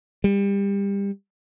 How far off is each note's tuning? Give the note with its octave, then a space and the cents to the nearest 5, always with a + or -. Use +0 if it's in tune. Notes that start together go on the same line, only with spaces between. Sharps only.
G3 +25